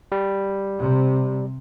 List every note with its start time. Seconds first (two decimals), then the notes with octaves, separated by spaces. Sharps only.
0.12 G3
0.80 C3